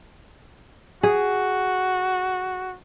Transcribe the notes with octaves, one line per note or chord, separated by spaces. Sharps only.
F#4 G#4